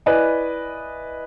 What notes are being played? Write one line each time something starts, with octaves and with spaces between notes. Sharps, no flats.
E4 B4 D5 D#5 G#5 B5